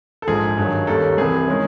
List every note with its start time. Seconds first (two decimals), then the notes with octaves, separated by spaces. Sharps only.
0.22 A4
0.27 A#1 G#2 F3 G#4
0.57 G2 D#3 F#3
0.87 D#2 D#3 G3 A#3 C#4 A4
1.17 C2 C3 E3 G#4
1.48 D#3 G#3 C#4 E4